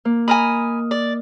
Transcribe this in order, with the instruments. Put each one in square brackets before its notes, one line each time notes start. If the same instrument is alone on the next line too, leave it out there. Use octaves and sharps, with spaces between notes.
[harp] A#3
[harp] D#5 D#6 F6 [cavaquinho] G#5 A#5 B5
[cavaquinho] D5